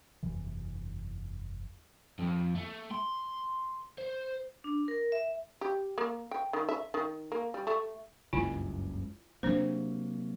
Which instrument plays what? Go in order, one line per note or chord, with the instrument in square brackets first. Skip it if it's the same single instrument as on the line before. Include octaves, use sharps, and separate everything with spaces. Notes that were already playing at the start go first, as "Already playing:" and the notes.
[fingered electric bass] F#1 E2 C3 E3
[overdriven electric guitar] F2
A3
C6
C5
[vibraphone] D4
A#4
E5
[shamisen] G4
A#3
G5
D#3
E5
D#3
A#3
G3
A3
[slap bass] F#1 C#2 G2 [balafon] E4 F4 G#5
[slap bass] C3 F#3 A#3 [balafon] D4 C5